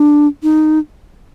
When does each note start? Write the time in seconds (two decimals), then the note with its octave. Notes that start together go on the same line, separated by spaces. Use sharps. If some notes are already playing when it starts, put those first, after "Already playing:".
Already playing: D4
0.43 D#4